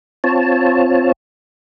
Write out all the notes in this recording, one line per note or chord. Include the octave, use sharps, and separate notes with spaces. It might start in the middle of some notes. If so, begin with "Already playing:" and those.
C4 F4 C#5 A5